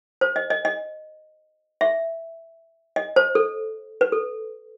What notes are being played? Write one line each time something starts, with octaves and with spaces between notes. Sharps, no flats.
C5
D#5
D#5
D#5
E5
D#5
C5
A4
B4
A4